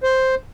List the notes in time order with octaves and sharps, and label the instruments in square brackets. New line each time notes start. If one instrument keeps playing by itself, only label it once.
[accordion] C5